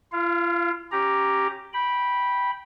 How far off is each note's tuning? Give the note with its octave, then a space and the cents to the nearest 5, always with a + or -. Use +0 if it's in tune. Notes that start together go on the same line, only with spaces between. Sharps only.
F4 -40 F5 +0
C#4 -5 G4 +0 A#5 +0
G5 +0 B5 -10